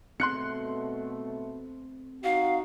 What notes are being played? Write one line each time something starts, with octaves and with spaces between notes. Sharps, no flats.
B2 A3 C4 C6 F#6 C#7
D#4 F#4 F5